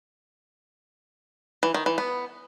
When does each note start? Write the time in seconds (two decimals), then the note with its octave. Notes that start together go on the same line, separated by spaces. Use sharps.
1.63 E3
1.74 D#3
1.86 E3
1.98 B3